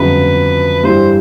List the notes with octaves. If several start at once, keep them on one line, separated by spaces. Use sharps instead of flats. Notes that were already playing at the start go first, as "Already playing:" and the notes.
Already playing: G1 F2 C#3 F#3 B4
G2 E3 G3 C5